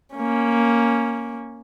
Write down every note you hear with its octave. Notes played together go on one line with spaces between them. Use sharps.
A#3 C#4